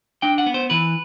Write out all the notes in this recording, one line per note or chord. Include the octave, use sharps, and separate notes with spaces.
D4 G5
F#5
B3
C5
E3 B4